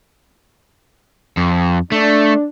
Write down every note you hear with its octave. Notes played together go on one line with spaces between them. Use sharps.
F2
A3 D4